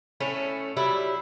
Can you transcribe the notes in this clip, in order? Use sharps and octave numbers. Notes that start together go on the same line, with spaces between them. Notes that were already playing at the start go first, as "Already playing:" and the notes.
A2 A3 C#4
F#3 G3 E4